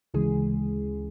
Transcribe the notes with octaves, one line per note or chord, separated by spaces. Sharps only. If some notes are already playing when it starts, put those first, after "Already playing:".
D2 C#3 E3 G#3 G#4